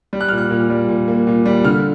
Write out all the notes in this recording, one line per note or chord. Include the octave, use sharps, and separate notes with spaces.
G3
F#6
A#2 F6
F#6
A#2
G3
A#2
A#3
A#2
G3
D3 F6